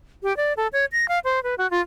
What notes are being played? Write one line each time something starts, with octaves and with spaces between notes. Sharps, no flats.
G4
D5
A4
C#5
A#6
F5
C5
B4
F#4
F4